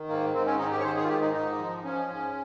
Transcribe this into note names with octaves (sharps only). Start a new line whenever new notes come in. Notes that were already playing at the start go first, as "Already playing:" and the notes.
Already playing: D#3
G#2 A#3
G#2 C4
C#4
D#3 D#4
G4
C#5
D#3 C5
G#4
F4
G#2 G4
D#4
G#2 D#4
F3
F3 C#4
G#2